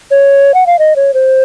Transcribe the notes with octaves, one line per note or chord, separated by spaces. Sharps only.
C#5
F#5
F5
D#5
C#5
C5